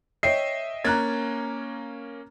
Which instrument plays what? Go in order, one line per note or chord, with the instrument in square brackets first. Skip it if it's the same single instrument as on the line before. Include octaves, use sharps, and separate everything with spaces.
[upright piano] C#5 C7 [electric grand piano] D#5 E5 G5
[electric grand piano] A#3 C#4 G#6 [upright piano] A#5 F#6 A6